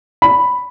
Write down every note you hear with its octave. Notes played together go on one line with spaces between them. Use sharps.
B5